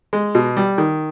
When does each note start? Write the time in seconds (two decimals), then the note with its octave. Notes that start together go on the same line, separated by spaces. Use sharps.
0.13 G#3
0.35 B2
0.57 G3
0.78 D#3